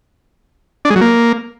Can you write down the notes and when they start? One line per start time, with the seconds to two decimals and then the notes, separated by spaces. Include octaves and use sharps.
0.85 D4
0.90 G#3
0.96 F#3
1.01 A#3